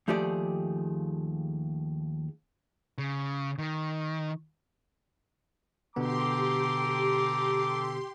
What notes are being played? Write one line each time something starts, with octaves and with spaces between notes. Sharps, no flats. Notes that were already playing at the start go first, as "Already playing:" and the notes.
D#2 F3 A3 G4 G#4 D5
C#3
D#3
B2 D3 B3 G4 A4 A#5 C6 D6